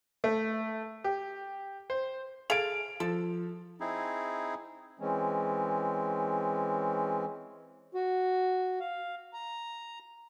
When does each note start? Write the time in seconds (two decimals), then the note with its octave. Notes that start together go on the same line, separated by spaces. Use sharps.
0.24 A3
1.04 G4
1.90 C5
2.50 G#4 A4 F5 D7 F7
3.00 F3 A4
3.80 C4 D#4 E4 G#4
5.00 E3 G#3 C4 C#4
7.94 F#4
8.80 F5
9.33 A#5